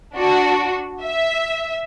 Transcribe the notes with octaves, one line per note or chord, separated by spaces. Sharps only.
D4 F#4
E5